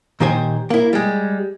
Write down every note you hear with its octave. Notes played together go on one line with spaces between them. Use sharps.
A#2 D#3 G4 C5 G#5
A#3 E4
G3 G#3